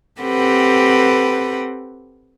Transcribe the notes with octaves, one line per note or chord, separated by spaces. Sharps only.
C4 G4 A4 B4 F#5